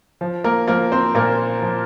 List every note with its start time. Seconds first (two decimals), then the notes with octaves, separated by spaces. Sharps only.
0.21 F3
0.44 A#3 A#4
0.67 F3 A#3 A#4
0.92 C4 C5
1.14 A#2 A#3 A#4
1.62 F3